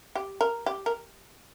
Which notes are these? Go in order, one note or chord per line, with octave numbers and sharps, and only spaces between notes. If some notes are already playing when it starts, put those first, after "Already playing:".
G4
A#4
G4
A#4